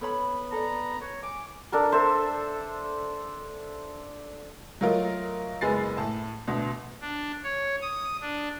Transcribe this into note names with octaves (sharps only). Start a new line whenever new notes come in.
B3 A4 C#5 B5
A4 D5 A#5
B4 C#5
G#5 D6
D4 A4 A#4
A4 C5 E5
F#3 A3 F4 A#4 D#5
F#1 G#3 B3 G#5 A6 C7
A2 A5
D2 B2
D4
C#5
D#6
D4